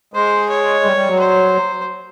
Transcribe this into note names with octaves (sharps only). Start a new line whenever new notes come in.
G#3 C5
C#5
G3
G3
F#3
C5